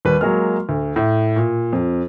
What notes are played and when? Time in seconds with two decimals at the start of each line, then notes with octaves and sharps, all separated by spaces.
0.05 D#2 G3 B4
0.21 F#3 G#3 A#3 F6
0.69 D2
0.96 A2
1.36 A#2
1.73 F2